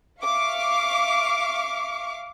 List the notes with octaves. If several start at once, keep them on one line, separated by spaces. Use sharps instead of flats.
E5 F5 C#6 D6